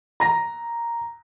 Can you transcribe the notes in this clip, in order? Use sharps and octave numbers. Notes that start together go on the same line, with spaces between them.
A#5 A#6